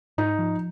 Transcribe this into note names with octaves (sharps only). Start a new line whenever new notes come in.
G#2 D#4
F3